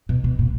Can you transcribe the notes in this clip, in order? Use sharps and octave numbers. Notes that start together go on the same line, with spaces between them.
B2
B2
A#2